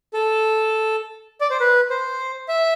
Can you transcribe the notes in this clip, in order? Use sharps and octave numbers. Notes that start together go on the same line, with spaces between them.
A4
D5
C5
B4
C5
E5